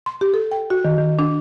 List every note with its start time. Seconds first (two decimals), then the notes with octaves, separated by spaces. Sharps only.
0.06 C6
0.21 G4
0.34 A4
0.51 G5
0.70 F#4
0.85 D#3
0.98 D#3
1.19 D4